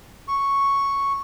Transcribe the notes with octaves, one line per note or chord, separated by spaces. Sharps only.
C#6